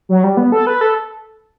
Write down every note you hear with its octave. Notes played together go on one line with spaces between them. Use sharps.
F#3
G3
B3
A4
B4
A4